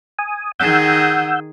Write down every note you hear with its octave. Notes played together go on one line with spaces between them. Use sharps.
G#5 D#6
D#3 G#4 F#5 E6 G6